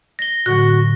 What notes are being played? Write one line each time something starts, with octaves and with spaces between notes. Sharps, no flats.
A#6 G7
A2 D3 F#3 F#4 F#6